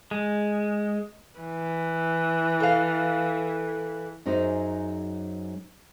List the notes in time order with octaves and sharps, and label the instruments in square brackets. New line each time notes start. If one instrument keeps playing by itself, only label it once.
[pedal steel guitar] G#3
[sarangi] E3
[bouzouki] A4 F5
[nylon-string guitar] F#2 F#3 D#4 G#4 C5